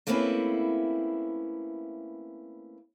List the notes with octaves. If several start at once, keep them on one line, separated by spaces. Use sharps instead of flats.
A3 A#3 C4 C#4 E4 B4